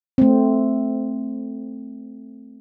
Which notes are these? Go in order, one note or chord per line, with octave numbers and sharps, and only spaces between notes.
A3 C4